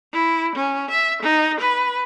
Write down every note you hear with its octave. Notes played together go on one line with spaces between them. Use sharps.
E4
C#4
E5
D#4
B4